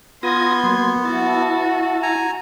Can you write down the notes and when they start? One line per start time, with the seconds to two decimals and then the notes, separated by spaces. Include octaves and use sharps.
0.23 B3 F4 C6 D#6 G#6 A#6
0.64 F#3 A#3
1.05 E4 F#4 A5
2.03 G#5 A#5